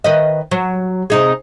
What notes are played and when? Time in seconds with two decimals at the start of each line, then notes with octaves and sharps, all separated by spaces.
0.04 D#3 B4 D#5
0.51 F#3
1.10 C3 D#4 G#4